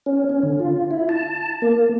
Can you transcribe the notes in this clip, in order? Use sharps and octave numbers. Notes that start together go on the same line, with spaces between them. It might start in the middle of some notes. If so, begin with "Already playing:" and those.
C#4
C#4
D3
F4
E4
A5
A#3